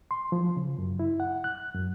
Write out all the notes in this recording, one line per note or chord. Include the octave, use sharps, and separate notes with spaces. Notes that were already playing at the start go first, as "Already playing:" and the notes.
C6
F3
C#3
F#2
E4
F#5
F#6
F#2